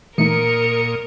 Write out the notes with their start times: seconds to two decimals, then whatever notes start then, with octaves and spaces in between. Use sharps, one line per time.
0.18 A#2 E3 A3 D#4 A#4 D#6 C#7